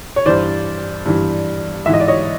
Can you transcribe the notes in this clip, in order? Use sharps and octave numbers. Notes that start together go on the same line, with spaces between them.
C#5
G2 E3 C5 D5
G2 E3
G#2 E3 E5
D#5
D5
C#5 D#5